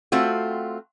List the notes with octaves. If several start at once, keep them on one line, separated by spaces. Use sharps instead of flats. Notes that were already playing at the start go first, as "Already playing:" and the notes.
A3 C4 F4 F#4